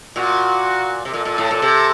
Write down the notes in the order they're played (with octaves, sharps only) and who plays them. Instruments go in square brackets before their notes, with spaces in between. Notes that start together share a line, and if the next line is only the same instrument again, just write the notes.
[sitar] A#2 [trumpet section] F#4
[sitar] C3
[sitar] A#2 [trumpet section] A4
[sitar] A#2
A2
A#2
C3